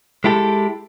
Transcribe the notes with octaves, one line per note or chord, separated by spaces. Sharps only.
G#3 E4 G4 A4